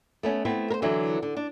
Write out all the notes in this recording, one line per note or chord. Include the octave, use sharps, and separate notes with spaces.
A3 B3 C#4
A3 B3 C4 E4
A#4 C5
D3 E3 F#3 E4
D3
D4